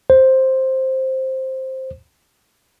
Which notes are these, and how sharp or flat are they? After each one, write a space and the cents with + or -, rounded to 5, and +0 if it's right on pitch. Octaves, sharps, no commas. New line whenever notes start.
C5 +10